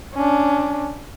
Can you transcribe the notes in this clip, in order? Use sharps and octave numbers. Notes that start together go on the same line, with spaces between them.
C#4 D4